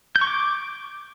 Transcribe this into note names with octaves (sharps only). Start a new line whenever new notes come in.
G6
C#6
D6